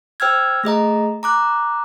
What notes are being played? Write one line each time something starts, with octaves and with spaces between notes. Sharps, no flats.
C5 G5 E6 F6 G#6
A3 G#4 D#5 A#5
A#5 D6 F#6